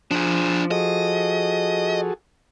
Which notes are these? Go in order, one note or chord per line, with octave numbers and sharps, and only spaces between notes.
F3 D4 G#4
F#4 G#4 A4 D#5